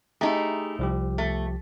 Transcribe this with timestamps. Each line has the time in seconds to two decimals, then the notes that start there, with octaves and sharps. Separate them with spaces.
0.21 A3 D#4 E4 G4 G#4 A#5
0.79 C2 F3 G4
1.18 A3